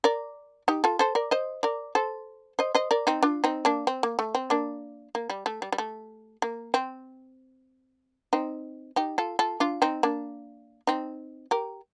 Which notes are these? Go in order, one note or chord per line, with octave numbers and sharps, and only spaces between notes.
A#4 D5
D#4 G4
F4 A4
A4 C5
A#4 D5
C5 D#5
A#4 D5
A4 C5
C5 D#5
C5 D#5
A#4 D5
C4 D#4
D4 F4
C4 D#4
A#3 D4
C4
A#3
A3
C4
A#3 D4
A#3
G3
A3
G3
G3
A3
A#3
C4
C4 D#4
D#4 G4
F4 A4
F4 A4
D4 F4
C4 D#4
A#3 D4
C4 D#4
G4 A#4